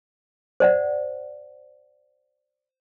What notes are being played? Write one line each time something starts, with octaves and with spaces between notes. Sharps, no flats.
C5 D5 F#5